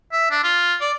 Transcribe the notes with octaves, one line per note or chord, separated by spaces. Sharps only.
E5
D4
F4
D5